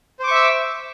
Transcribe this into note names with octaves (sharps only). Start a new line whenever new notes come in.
C5 E5 C#6 D6 E6